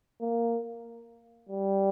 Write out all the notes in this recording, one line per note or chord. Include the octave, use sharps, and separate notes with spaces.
A#3
G3